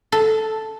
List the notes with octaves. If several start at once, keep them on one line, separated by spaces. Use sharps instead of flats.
A4